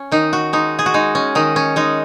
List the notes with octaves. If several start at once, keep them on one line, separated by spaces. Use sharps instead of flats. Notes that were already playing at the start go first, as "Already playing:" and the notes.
Already playing: C#4
D#3 D#4
F#4
G#3 D#4
G#4
F#4
G#3 D#4
C#4
D#3 D#4
C#4
G#3 D#4